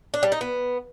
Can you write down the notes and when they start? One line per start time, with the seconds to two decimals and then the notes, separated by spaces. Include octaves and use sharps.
0.14 D4
0.23 G3
0.32 D#4
0.41 B3